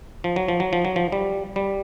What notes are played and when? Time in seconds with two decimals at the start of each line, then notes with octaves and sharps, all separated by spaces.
0.24 F3
0.36 F#3
0.48 F3
0.60 F#3
0.73 F3
0.85 F#3
0.96 F3
1.12 G3
1.56 G3